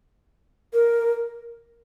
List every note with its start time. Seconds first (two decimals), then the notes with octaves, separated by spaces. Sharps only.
0.74 A#4